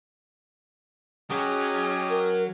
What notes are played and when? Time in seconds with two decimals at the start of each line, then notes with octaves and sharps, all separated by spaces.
1.30 F#3 C#4 G4 G#4 D#5 D#6
2.09 A#4